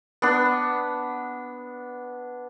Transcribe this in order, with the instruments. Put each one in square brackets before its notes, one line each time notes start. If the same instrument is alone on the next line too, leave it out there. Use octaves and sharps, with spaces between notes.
[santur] B3 D4